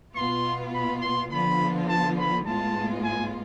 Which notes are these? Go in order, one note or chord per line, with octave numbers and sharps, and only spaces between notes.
B2 B3 F4 C6
B5
C6
D3 F3 B3 F4 B5
A5
B5
A2 G#3 B3 F4 A5
G#5